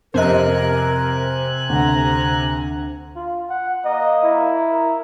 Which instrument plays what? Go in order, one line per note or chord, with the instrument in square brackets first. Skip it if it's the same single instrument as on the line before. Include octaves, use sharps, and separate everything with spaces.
[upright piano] F2 D#5 [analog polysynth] C3 G#5 F#6 [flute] A#4
[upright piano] D2 F#5 [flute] A#5
[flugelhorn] F4
F#5
[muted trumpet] A#3 [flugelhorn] D#5
[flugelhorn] E4
[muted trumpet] A#4